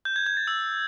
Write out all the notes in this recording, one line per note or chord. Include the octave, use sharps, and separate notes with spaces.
G6
G#6
G#6
A6
E6